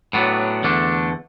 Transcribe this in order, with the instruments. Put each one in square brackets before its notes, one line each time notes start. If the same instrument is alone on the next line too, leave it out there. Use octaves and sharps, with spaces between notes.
[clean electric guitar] A2 F#3 B3 D4
E2 D3 A3 D4